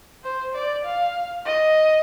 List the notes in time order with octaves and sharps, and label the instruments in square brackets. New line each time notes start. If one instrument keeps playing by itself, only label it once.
[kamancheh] C5
D5
F5
D#5